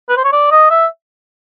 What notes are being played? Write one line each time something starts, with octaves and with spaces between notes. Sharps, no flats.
B4
C5
C#5
D5
D#5
E5